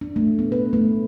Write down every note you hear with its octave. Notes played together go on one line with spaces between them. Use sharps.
D4
A3
B3
B4
A3